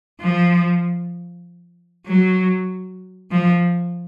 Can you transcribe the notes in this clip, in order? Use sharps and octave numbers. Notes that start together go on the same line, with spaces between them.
F3
F#3
F3